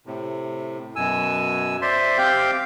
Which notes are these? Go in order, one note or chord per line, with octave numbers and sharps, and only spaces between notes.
A2 C3
F#2 B2 G#5 E6
C5 D5 E5 C6
C4 G4 F5 G5 D6 G6